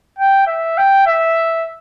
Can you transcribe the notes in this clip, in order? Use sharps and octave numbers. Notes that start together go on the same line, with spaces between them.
G5
E5
G5
E5